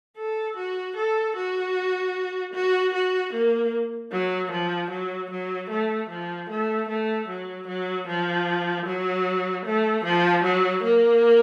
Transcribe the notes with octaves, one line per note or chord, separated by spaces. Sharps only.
A4
F#4
A4
F#4
F#4
F#4
A#3
F#3
F3
F#3
F#3
A3
F3
A3
A3
F#3
F#3
F3
F#3
A3
F3
F#3
A#3